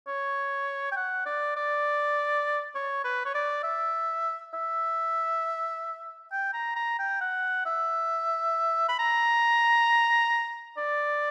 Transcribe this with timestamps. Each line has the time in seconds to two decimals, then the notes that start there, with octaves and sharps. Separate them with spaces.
0.07 C#5
0.92 G5
0.96 F#5
1.26 D5
1.56 D5
2.75 C#5
3.04 B4
3.26 C#5
3.35 D5
3.64 E5
4.54 E5
6.32 G5
6.54 A#5
6.76 A#5
6.99 G5
7.21 F#5
7.66 E5
8.89 B5
8.99 A#5
10.78 D5